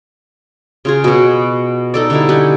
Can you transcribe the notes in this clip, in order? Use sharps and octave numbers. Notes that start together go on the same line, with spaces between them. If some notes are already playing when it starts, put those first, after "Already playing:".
C#3 F4 G#4
B2 B3
D#4 A4 D5
D3 G3 D#4 E4
G4 F#5 G#5